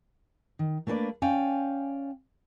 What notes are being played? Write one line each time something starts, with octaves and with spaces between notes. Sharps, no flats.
D#3
A3 A#3 D4 A4 B4 D5
C#4 D5 F5 G5 G#5